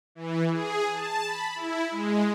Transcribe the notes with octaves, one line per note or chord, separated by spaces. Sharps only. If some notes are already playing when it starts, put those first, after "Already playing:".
E3
G#4
A5
B5
E4
G#3